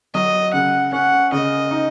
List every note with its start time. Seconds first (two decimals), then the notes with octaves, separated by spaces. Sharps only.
0.14 F#3 D#5
0.53 C#3 F#5
0.92 C#4 F#5
1.32 C#3 D#5
1.71 D#4